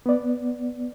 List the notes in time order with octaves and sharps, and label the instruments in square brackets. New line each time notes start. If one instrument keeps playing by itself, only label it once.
[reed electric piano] B3 D5